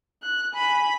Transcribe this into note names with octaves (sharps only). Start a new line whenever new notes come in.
F#6
G#5 B5